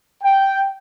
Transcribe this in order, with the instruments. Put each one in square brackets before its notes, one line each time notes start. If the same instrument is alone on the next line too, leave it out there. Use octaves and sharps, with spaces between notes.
[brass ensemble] G5